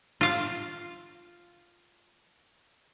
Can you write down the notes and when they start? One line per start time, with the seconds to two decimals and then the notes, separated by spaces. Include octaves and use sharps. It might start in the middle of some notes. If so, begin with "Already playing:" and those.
0.21 F4 F5